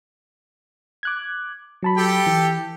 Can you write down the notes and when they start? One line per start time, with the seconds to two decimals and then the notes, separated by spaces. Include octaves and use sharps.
1.03 D6 F#6 G#6
1.83 F#3 A5 B5
1.97 G4 A4 G5
2.26 E3